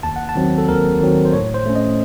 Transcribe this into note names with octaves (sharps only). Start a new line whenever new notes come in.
D#2 A5
F#5
A5
D#3 F#3 C4
A4
D#2 A#4
D#3 F#3 C4
C5
A2 C#5
C5
A3 C#4
D#5